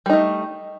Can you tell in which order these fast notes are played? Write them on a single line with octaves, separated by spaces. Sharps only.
G3 D#4 A3